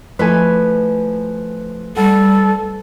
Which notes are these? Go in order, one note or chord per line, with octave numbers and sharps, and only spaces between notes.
F3 A3 E4 B4 G#5
G3 A4 F#5